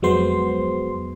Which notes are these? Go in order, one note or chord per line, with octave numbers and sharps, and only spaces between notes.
F2 F#3 G#3 B3 C5 C6